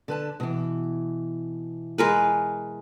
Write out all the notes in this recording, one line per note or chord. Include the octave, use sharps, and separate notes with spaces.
D3 B4 A5
B2 E3
G#3 A#4 B4